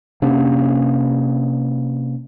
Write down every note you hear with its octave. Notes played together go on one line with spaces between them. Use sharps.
C3 A#3 C#4 D4